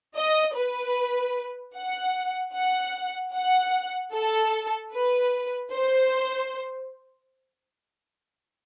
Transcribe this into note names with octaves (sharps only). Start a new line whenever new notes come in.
D#5
B4
F#5
F#5
F#5
A4
B4
C5